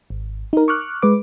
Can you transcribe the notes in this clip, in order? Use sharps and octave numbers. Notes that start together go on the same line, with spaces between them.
G#1
D#4 A#4
C#6 D6 F6 F#6
G#3 B4 D6